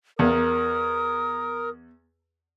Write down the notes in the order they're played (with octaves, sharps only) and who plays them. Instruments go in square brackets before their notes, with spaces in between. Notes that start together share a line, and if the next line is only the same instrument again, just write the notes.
[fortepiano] E2 [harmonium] A#4 [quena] D#6